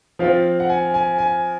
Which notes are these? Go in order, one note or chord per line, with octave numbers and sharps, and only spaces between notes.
F3 C4 F4 F5
F#5
G#5
G#5
G#5